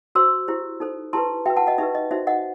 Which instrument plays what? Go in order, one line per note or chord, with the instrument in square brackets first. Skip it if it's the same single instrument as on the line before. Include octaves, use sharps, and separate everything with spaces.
[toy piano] F#4 C5 C6 E6
E4 G4 C5
D#4 A4 C5
E4 G4 B4 A5 C6
F#4 B4 E5 G5
F#5 A5
D#5 F#5
D#4 G4 B4 E5
D#5
D#4 F#4 C5 E5
D#5 F#5